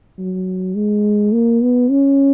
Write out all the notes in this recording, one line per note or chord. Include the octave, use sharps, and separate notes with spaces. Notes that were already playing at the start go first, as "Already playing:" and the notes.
F#3
G#3
A#3
B3
C#4